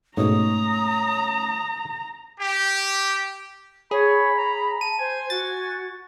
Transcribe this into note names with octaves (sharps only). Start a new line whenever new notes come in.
G#2 B2 A3 C#4 C#5 A#5 D#6
G4
G#4 C#5 B5
A#5
A5 D#7
C5 G#5
F#4 A6